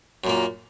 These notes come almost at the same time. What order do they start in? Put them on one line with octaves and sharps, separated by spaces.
F#2 A#2 A#3